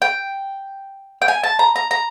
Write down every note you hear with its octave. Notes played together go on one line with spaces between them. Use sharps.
G5
G5
G#5
A5
A#5
A#5
A#5